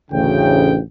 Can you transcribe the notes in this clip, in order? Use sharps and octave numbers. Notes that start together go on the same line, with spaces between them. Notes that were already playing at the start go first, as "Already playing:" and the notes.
A1 D2 C#3 G5